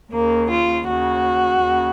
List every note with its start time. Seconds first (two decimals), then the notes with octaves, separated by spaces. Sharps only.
0.12 D#2 C#3 A#3
0.50 F4
0.86 D#2 C#3 F#4
1.59 D#2 C#3